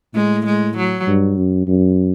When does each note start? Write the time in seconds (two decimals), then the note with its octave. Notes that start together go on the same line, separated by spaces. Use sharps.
0.14 A2 G#3
0.45 G#3
0.77 F#3
1.07 G2
1.37 F#2
1.67 F#2